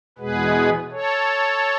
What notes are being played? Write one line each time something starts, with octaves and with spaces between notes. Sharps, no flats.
E2 B2 G#3 B3 G#4 B4
A4 C#5